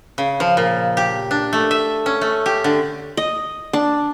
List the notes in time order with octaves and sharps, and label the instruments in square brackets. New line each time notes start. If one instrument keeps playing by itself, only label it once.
[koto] C#3
F3
A#2
G4
D4
A3
E5
C#4
A3
G4
D3
[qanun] D#5
D4